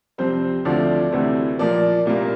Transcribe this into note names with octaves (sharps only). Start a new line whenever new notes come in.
F2 C3 G3 C4 C5
D2 D3 F3 A3 C4 D5
D2 C3 E3 A3 C4
A#2 F3 A#3 D5
C2 A#2 G3 A#3